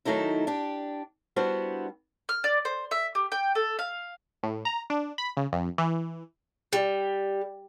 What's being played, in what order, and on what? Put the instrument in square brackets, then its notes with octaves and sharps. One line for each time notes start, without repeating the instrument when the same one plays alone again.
[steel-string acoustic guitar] D#3 F#3 A3 D#4 E4
D4 G4
G3 B3 D4 E4 F#4 C5
[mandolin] F6
D5
C5
E5
G4
G5
A4
F5
[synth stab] A2
A#5
D4
B5
C#3
F2
E3
[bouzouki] G3